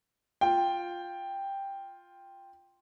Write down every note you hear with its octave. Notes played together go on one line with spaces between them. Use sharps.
F4 G5